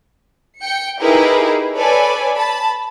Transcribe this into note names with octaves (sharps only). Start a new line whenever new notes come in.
G5 C#7
D#4 E4 G4 G#4 A#4 B4
A4 B4 C#5 D5 G#5 B5
A5 B5